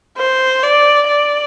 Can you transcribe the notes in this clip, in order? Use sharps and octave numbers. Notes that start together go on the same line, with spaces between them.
C5
D5
D5